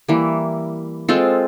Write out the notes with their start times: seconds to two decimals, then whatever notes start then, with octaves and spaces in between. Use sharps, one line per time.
0.08 E3 G3 A#3
1.09 G#3 C4 F4 A4